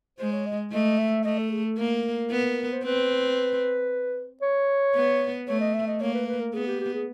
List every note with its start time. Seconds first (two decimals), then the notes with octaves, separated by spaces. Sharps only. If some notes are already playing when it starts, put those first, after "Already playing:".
0.19 G#3 C5
0.32 C#5
0.46 D#5
0.72 A3 D#5
0.98 E5
1.25 A3 D#5
1.38 A4
1.52 G#4
1.64 A4
1.78 A#3 A#4
2.31 B3
2.72 C5
2.84 C4 B4
4.42 C#5
4.95 B3
5.48 A3 C#5
5.60 D#5
5.74 E5
5.87 D#5
6.01 A#3 C#5
6.14 B4
6.27 B4
6.40 A#4
6.54 B3 G#4
6.67 G4
6.80 G4
6.94 G#4